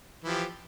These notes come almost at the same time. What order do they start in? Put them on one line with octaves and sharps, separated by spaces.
E3 F3 G4